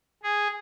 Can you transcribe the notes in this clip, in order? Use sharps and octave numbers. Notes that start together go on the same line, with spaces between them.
G#4